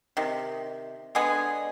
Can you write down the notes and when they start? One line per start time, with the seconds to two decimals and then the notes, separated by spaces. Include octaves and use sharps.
0.17 C3 D#3
1.15 D3 G#3 B3 G#4